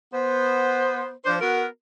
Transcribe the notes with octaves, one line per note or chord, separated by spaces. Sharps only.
B3 C5
F3 D4 C5
B3 F#4 A#4